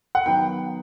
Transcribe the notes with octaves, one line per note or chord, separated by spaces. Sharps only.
F#5
D#3 F#3 B3 G5